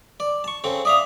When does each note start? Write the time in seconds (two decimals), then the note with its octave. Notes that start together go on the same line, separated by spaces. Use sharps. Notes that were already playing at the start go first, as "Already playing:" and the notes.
0.20 D5
0.44 A5 C#6
0.64 C#3 C4 A4
0.85 D5 E5 F5 D#6